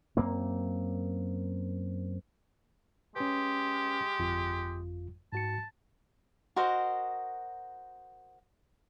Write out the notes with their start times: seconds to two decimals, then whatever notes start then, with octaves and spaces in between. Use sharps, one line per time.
0.17 F#2 A#3 C4
3.16 G#3 C#4 G4 B4
4.19 G1 F2 F4
5.33 G#2 F#4 A5 C#7
6.56 F#4 A#4 C5 D#5